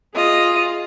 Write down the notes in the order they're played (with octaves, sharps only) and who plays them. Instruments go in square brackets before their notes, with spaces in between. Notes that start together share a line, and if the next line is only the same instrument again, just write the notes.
[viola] F4 G#4 [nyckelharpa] D#5